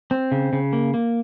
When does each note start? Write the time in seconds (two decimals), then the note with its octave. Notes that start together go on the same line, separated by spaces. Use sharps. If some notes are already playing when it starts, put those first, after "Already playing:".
0.11 C4
0.32 C#3
0.53 C#3
0.73 A#3
0.94 A#3